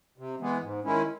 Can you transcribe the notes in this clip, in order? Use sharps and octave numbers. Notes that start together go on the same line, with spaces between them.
C3
E3 G#3 B3
G#2
D#3 G#3 C#4 E4